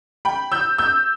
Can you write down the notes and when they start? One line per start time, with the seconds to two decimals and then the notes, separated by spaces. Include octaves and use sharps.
0.25 G5 B5
0.52 E6 G6
0.78 E6 G6